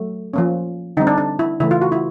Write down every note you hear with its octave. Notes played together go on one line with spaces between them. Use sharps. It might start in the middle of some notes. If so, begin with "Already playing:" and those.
Already playing: F#3 A3
F3 A#3 C#4
D3 G3 C4 D#4
D4
D4
E4
C#3 E3 A3 E4
F4
F#4
E4